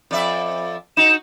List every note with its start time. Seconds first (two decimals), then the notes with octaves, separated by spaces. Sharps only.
0.11 F2 D5 E5
0.97 D#4 F#4 E7